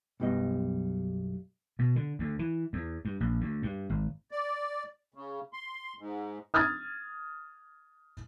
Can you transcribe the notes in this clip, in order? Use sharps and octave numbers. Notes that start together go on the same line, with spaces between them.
B1 F#2 G3 B3 D#5
B2
D3
D2
E3
E2
G2
A#1
D2
G2
G#1
D5
C#3
C6
G#2
D#6 F6 G#6 A6